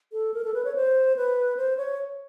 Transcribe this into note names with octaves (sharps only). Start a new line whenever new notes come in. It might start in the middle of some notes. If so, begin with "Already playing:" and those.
A4
A#4
A4
B4
C#5
C5
B4
C5
C#5